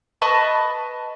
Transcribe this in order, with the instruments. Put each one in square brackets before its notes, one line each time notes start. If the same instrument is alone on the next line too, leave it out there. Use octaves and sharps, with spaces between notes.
[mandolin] B4 D#5 A5 C#6